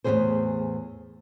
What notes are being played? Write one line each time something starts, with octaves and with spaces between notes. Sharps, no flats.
E2 A2 D#3 E3 G#4 C5